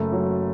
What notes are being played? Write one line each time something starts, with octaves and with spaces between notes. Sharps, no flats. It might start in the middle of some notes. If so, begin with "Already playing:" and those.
Already playing: F#1 A3
F#3